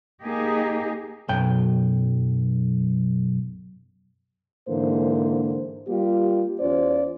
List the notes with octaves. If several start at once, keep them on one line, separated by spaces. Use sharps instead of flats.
A#3 D#4 G4 G#4 D#5
B1 F#2 G5
G#2 D3 E3 A#3 C5
G3 A#3 F4 G4
E2 C#4 F4 C5 D5